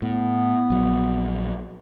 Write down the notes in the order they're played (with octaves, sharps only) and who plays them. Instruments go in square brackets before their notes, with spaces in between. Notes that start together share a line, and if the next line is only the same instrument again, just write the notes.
[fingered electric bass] A2 [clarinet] B3
[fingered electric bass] A#1 F#3